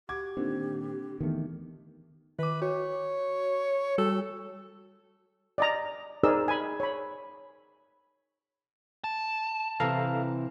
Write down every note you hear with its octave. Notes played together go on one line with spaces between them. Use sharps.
F#4 G4 D6 G#6
A#2 D3 D#3 C4
E2 B2 D#3 A3
D#3 B4 D6
F#4 C#5
G3 F#4 A4
D5 D#5 A#5
D#4 G#4 A#4 C5 D5 E6
G#5 B5
C#5 B5
A5
C3 E3 A4 F5 A#5